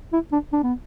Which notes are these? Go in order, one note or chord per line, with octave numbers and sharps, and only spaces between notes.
E4
D4
D4
B3